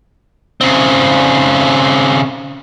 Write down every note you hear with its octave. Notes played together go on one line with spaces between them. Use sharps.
C#3 C4